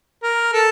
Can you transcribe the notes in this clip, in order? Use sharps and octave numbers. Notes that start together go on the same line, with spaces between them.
A#4
A4